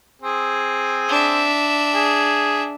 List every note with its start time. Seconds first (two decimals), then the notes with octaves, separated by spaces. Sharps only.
0.22 C4 G#4
1.09 D4 E5
1.94 G#4